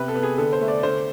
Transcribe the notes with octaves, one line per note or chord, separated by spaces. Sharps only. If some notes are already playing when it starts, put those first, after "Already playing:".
Already playing: C3 B3 B4
A4
B3
G#4
D3 A4
C5
A3
D5
D3 C5